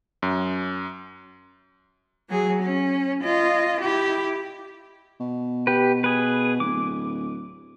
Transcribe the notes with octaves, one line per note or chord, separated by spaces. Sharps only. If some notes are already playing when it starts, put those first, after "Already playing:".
F#2
F#3 G#4
C#4
F4 D#5
E4 G4
B2
G4 B4
G#4 B4
D1 D6